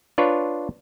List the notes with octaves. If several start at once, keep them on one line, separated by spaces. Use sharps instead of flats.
D4 F4 B4 C#5